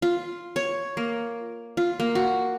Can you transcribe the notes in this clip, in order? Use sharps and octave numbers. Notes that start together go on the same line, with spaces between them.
F4
C#5
A#3
F4
A#3
F#4